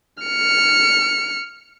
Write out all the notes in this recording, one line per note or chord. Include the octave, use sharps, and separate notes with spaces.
F6 C#7